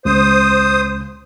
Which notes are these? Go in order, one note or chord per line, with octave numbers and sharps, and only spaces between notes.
C#2 C5 D#6